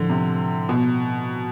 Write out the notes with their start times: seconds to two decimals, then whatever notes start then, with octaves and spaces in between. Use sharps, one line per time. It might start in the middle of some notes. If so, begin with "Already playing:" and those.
Already playing: A2 D3 F3 A3
0.09 C3
0.69 B2